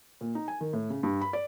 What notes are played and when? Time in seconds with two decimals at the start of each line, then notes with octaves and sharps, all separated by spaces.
0.21 A#2
0.35 D#4
0.48 G#5
0.61 D#3
0.73 A2
0.90 C#3
1.03 G2
1.21 B5
1.33 D5